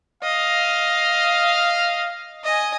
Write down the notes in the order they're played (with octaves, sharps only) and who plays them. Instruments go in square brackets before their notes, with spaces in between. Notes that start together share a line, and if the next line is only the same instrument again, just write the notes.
[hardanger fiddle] D#5 [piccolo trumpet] F5
[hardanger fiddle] D#5 G#5